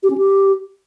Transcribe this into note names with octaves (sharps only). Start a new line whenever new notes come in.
G4
C#4
G4